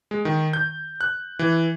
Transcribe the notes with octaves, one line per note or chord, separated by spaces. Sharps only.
G#3
D#3
G6
F#6
E3